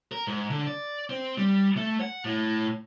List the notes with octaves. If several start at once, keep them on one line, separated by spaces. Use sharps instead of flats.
A#4
G#2
D3
D5
C4
G3
A3
F#5
A2